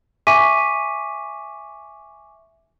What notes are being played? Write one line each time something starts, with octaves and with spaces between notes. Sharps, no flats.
E5 G#5 C#6 D6 B6 D#7